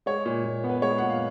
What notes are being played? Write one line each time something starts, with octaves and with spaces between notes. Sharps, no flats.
G#3 C#5
A#2
A#2
B3
B4
G#3 C#5
A#2 F#5
F5